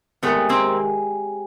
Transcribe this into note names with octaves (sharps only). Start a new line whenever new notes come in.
C3 D#3 G#3 A3 B3
A#3 C4